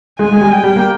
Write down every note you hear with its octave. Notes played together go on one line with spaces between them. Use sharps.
G#3 G#5
G#3
G3
G5
G3
A#3